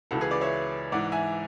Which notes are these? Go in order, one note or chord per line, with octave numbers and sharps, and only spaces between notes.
C#2 C#3 E3 F#4 A4
G#4 B4
B4 D5
C#5 E5
G#2 E3 D5 F#5
E5 G#5